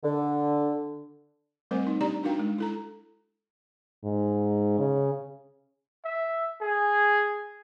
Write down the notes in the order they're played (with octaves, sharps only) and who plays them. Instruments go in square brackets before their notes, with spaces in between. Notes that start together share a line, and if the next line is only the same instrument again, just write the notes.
[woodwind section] D3
[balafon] G3 A3 C4 A#4 C5
D#4
D4 G4 D5 A#5
D4 D#4 F#4 A#4 F5 G5
G#3
E4 A4 A#5
[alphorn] G#2
C#3
[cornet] E5
G#4